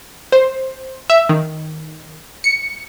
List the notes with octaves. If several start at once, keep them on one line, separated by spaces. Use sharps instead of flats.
C5
E5
D#3
C#7